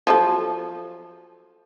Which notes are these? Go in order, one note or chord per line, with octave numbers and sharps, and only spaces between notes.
F3 F#3 A4